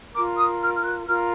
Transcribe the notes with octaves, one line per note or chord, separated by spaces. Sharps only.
F4 A#4 D6
D#6
F6
F6
F#6
F4 A#4 F6